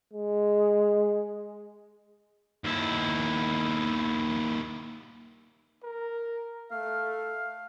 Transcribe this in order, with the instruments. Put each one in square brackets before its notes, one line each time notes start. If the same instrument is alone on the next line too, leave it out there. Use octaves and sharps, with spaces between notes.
[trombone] G#3
[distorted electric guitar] D#2 E4
[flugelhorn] A#4
[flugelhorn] A3 [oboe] F5